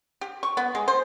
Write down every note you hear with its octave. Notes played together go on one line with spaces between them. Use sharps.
G4
C#6
B3
G#3
C5